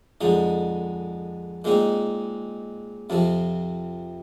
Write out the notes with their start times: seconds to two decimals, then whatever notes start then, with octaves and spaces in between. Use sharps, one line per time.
0.21 F2 D3 G#3 D#4
1.64 A#2 G#3 C4 D#4
3.10 F2 C3 F3 C4